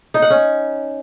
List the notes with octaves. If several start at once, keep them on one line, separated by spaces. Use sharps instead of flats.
D#4
F#5
C#4